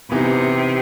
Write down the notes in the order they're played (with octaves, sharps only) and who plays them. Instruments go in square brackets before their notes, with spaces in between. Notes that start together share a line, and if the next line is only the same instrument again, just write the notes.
[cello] C3 [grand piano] E3 B3 D#4 G4